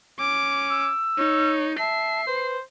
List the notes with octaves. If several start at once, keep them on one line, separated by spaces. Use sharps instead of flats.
C#4 D6
E6
D#4 C#5
E5 A5 C7
B4 C5